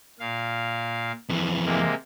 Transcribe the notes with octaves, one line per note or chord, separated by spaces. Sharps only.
A#2 F5
F2 E3
C3 G#3 A#3